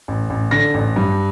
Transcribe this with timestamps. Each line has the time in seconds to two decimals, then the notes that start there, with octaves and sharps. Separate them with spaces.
0.08 A1
0.30 A1
0.51 D3 A#6
0.74 A1
0.96 G2